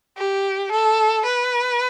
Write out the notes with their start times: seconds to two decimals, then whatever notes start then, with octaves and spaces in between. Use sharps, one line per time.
0.17 G4
0.72 A4
1.25 B4